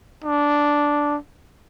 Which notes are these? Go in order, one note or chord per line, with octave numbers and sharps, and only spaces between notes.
D4